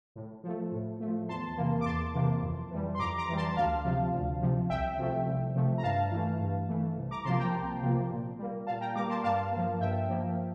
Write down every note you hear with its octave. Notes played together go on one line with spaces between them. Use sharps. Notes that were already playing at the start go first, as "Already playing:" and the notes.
A2
F3 A3
A2
A3
F3
E2 A5 C6
C3 E3 A#3
D6
E2 A5 C6
C3 E3 A#3
F2
E3 G3
C6
F2 A#5 D6
A#5 D6
E3 G3 D6
A5 C6
D2 F5 A5
C3 F3
D2
C3 F3
C2 E5 G5
C3 F3 A3
C2
C3 F3 A3
A#5
G2 F5 A5
E3 A3
G2
E3 A3
C2
A#5 D6
C3 F3 A#3 A5 C6
G5 A#5
C2
C3 F3 A#3
A#2
G3 A#3
A#2 F5 A5
G5 A#5
G3 A#3 A#5 D6
A5 C6
G2 F5 A5
F3 A#3
G2 E5 G5
F3 A#3